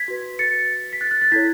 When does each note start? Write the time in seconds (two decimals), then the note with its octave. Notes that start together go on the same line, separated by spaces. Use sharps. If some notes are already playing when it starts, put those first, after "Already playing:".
Already playing: G#6 B6
0.08 F#4 B4
0.39 A6 C#7
0.93 B6
1.01 F#6 A6
1.11 F#6 A6
1.21 F#6 A6
1.32 E4 A4 C#5 G#6 B6